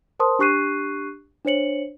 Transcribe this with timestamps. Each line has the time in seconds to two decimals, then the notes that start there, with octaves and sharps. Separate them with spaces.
0.20 A#4 C5 A5 C6 D#6
0.39 D4 G4 C#6 F#6 C7 D#7
1.45 D4 C5 C#5 C#7 F#7